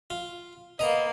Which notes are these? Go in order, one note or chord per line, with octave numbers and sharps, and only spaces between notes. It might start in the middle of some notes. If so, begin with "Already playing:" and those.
F4
A#3 B3 D#5 A#5